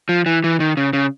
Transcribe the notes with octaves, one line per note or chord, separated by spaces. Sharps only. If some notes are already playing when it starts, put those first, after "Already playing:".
F3
E3
E3
D#3
C#3
C#3